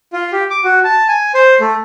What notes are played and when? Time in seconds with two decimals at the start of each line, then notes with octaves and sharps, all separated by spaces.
0.13 F4
0.32 G4
0.50 D6
0.64 F#4
0.84 A5
1.08 G#5
1.34 C5
1.60 A3